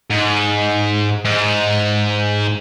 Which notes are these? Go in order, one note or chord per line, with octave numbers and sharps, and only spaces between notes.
G#2
G#2